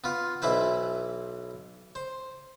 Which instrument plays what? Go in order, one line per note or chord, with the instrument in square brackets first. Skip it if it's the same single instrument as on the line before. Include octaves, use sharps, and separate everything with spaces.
[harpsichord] B3 F4
B1 E3 E4 B4 C5
C5